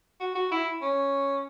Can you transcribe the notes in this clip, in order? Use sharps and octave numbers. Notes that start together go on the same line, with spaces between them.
F#4
F#4
E4
C#4